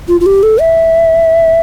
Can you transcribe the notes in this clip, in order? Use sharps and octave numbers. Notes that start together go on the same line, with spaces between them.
F4
F4
G4
A4
E5